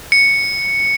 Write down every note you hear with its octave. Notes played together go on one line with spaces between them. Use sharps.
C#7